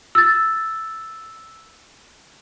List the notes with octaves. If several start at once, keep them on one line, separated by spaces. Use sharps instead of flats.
E6 A6